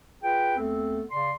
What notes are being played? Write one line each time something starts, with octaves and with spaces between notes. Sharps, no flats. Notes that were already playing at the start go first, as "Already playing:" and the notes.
F4 G#4 B4 G5
D#2 A3 B3 C4 A4
C#3 D5 C6